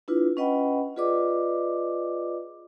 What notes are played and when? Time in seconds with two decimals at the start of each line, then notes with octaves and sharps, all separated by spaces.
0.08 D4 E4 F4 B4
0.37 C#4 B4 D#5 F#5 G5 B5
0.96 F4 G#4 B4 D5 D#5 D6